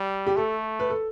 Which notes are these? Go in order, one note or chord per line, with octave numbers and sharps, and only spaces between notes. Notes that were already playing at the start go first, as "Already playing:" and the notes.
Already playing: G3
G4
A3 A4
B4
A4